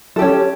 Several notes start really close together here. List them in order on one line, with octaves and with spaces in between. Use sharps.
A4 G4 C#4